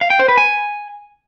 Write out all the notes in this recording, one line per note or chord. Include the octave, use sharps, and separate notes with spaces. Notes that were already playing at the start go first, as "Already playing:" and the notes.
F5
G5
C5
B4
G#5